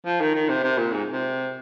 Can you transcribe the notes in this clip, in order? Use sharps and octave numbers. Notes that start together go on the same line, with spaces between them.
F3
D#3
D#3
C3
C3
A#2
G#2
C3